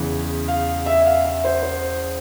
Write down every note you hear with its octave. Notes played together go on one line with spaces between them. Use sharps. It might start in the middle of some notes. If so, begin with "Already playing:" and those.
Already playing: E2 C#3 E3
F5
E5
E5
F5
E5
C5
C5